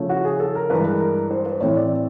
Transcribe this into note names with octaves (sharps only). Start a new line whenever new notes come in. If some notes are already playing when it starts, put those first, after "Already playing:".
Already playing: C#3 F3 A3 C#4
F#4
G#4
A4
A#4
G2 E3 G#3 B4
A#4
A#4
C5
B4
A2 E3 A3 C4 C#5
D5